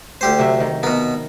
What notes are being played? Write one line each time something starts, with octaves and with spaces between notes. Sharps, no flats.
D2 G4 C5
C3 F#3 E5
D#3
B2 B3 A#4